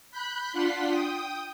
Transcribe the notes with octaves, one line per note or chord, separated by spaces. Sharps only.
B5 F#6 G6
D4 F4 F#5 C6 B6
G5 D#6